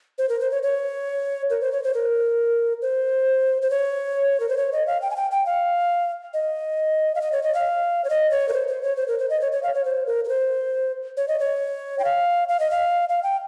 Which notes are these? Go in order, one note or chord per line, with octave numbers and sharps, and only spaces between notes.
C5
A#4
C5
C#5
C#5
A#4
C5
C#5
C5
A#4
C5
C5
C#5
A#4
C5
C#5
D#5
F5
G5
G#5
G5
G5
F5
D#5
F5
D#5
C#5
D#5
F5
C#5
D#5
C#5
A#4
C5
C5
C#5
C5
A#4
C5
D#5
C#5
C#5
F5
C#5
C5
A#4
A#4
C5
C#5
D#5
C#5
G5
F5
F5
D#5
F5
F5
G5